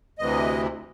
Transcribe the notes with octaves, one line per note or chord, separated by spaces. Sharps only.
D2 C3 E3 D#5